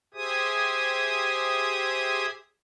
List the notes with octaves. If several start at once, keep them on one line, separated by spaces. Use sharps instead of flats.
G4 G#4 C5 E5 G#5 D#6